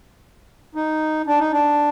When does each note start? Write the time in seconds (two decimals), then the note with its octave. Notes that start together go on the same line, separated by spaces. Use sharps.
0.75 D#4
1.27 D4
1.39 D#4
1.52 D4